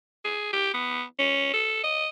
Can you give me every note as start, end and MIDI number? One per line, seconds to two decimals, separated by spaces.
0.25 0.52 68
0.53 0.73 67
0.74 1.03 59
1.19 1.53 61
1.54 1.81 69
1.84 2.08 75